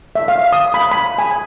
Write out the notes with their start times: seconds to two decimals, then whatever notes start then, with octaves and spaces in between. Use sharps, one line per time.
0.15 E5
0.28 F5
0.53 D#6
0.74 B5
0.92 B5
1.18 G#5